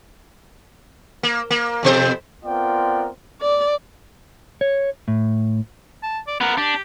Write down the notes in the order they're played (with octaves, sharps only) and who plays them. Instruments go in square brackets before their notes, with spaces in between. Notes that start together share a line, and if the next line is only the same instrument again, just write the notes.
[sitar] A#3
A#3
F2 B2 C5
[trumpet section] B3 C4 F4 A#4 D5 G5
[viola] D5
[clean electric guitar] C#5
A2
[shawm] A5
D5
[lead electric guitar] B3 A#4 [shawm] F#5
[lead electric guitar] D4 [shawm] G4